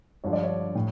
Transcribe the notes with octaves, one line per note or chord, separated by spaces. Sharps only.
G2 D3 F3 C#5
D5
C#5
A2